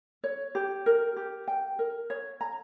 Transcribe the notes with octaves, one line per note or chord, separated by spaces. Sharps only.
C#5
G4
A#4
G4
G5
A#4
C#5
A#5